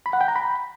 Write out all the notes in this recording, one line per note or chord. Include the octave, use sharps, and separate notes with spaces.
B5
F#5
G5
A#5
B5